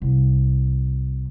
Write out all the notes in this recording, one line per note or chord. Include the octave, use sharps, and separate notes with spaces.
C2